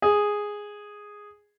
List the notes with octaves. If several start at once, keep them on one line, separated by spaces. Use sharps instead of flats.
G#4